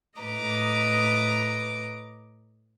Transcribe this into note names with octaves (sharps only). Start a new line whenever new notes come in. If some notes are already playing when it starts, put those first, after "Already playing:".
A2 B4 D#5 A#5 D6